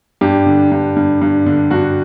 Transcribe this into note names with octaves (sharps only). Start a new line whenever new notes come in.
G2 G4
D3
G2
G2
G2
D3
G2 F#4